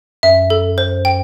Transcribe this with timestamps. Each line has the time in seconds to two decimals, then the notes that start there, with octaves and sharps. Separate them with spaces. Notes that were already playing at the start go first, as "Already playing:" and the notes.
0.23 F#2 E5
0.50 A4
0.78 C5
1.05 G5